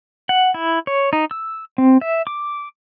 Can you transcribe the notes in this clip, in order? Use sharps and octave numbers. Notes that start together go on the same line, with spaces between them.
F#5
E4
C#5
D#4
E6
C4
E5
D6